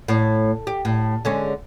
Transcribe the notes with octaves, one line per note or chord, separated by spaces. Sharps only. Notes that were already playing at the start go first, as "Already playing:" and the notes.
A2
G4
A2
D3 G#3 C#4